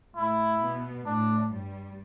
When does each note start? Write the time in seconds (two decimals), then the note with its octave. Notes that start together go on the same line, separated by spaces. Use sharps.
0.16 A2 A3 E4
0.61 B2 B3
1.06 A2 A3 D4
1.51 G2 G3